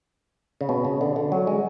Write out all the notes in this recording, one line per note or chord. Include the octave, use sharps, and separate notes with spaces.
C#3
B2
C#3
D3
D3
F#3
G#3